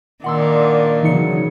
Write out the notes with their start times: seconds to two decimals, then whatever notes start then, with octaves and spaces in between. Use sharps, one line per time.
0.24 A#2 D#3 D4 F#5 C6 E6
1.03 C#3 E3 F#3 D#4 C#7